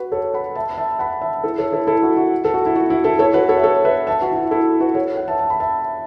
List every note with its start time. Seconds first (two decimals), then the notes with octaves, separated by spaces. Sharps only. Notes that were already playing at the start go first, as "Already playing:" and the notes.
Already playing: F#4 B4
0.12 A4 C#5
0.34 F#5 B5
0.55 E5 A5
0.70 B5
0.78 E5 A5
0.99 F#5 B5
1.22 E5 A5
1.44 E4 A4
1.58 A4 C#5
1.72 E4 A4
1.87 E4 A4
2.03 F#4
2.17 F#4
2.45 A4
2.54 F#4
2.66 E4
2.76 F#4
2.90 E4
3.04 E4 A4
3.19 A4 C#5
3.34 F#4 B4
3.49 A4 C#5
3.58 E5
3.63 A4 C#5
3.85 B4 E5
4.07 E5 A5
4.22 F#4
4.32 E4
4.37 F#4
4.51 E4 A4
4.80 F#4 B4
4.95 A4 C#5
5.17 C#5 F#5
5.28 E5 A5
5.39 A5
5.50 B5
5.60 E5 A5